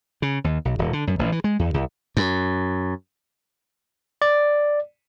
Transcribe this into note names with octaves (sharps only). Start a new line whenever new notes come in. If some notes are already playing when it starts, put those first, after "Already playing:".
C#3
D#2
B1
D#1
D3
F#2
A1
E3
G#3
E2
C2
F#2
D5